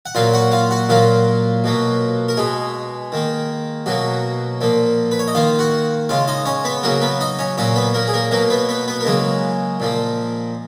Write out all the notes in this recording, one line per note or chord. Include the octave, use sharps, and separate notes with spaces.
F#5
A#2 F#3 A#3 F4 F5
F#4 F#5
F4 F5
F#4 F#5
A#2 F#3 A#3 F4 F5
B2 F#3 A#3
A#4
B2 G#3 G#4
D#3 A#3
B2 F#3 A#3 F#4
A#2 F3 A#3
B4
C#5
D#5
D#3 A#3 F4 F5
F#4 F#5
C#3 G#3 F4 F5
D#4 D#5
C#4 C#5
B3 B4
C#3 F#3 A#3 A#4
B3 B4
D#4 D#5
C#4 C#5
A#2 F#3 A#3 C#4 C#5
B3 B4
A#3 A#4
G#4
A#3 A#4
B2 F#3 A#3 A#4
B3 B4
B3 B4
B3 B4
A#4
C#3 F#3 G#3 A#3 G#4
A#2 F3 A#3